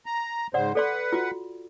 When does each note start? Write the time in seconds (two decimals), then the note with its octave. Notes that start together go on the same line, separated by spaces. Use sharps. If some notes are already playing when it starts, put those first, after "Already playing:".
0.06 A#5
0.54 G#2 C#3 C5 D5 F#5
0.75 A4 B4 D5 F#5 C6
1.13 F4 F#4